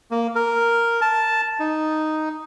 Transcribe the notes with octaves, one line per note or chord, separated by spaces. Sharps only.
A#3
A#4
A5
D#4